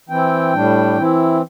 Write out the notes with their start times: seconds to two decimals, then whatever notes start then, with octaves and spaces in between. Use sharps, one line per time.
0.09 E3 C4 E4 G5
0.53 A2 G3 D4
0.98 E3 C4 E4